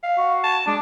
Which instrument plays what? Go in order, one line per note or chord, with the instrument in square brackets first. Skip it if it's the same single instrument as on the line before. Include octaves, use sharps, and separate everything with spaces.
[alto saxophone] F5
[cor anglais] F#4
[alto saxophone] A5
[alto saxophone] G#3 [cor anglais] D4